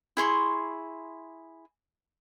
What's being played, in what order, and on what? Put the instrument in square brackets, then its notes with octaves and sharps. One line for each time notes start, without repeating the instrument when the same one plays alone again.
[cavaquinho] E4 G#4 C6 C#6